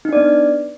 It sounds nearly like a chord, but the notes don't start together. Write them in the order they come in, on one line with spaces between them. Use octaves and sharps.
D#4 D4 D5 B3